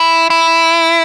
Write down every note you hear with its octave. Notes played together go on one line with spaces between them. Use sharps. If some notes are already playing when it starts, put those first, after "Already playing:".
Already playing: E4
E4